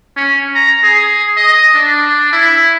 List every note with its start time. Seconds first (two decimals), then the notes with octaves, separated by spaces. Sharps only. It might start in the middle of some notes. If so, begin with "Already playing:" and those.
0.17 C#4
0.55 A#5
0.84 G#4
1.37 D#5
1.75 D4
2.33 E4